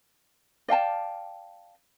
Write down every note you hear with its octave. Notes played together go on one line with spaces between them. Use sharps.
D5 F5 G5 A5